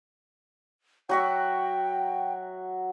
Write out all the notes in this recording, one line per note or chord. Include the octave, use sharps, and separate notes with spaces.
F#3 F#4 E5 G5